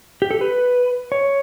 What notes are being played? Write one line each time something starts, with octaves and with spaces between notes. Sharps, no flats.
G4
A4
B4
C#5